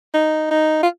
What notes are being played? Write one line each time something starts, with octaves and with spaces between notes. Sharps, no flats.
D#4
D#4
F4